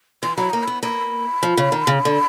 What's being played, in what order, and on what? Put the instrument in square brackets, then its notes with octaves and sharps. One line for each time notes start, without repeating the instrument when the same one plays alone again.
[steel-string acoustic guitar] E3 [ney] C6
[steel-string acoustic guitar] F#3 [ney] B5
[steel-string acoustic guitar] A#3 [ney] A#5
[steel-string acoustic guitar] B3 [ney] B5
[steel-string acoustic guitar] A#3 [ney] B5
[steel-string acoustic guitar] F3
C#3
D#3
C#3
D3